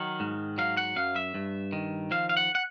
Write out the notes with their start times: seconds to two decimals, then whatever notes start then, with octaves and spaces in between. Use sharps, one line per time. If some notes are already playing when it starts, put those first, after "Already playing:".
Already playing: D#3 F#3 F#5
0.20 G#2
0.58 F#3 F5
0.77 F#5
0.96 F#2 F5
1.16 E5
1.34 G2
1.73 D#3
2.11 F3 F5
2.29 F5
2.37 F#5
2.55 F#5